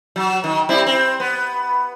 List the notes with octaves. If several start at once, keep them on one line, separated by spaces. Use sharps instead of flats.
F#3
D#3
G3 C4 E4
C4
B3